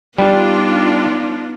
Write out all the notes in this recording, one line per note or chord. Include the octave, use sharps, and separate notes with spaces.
G3 B3 D4 D#4 F4